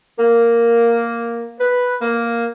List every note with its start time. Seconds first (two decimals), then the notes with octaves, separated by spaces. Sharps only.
0.19 A#3
1.60 B4
2.02 A#3